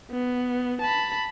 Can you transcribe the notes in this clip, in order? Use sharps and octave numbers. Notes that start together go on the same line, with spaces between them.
B3
A5 B5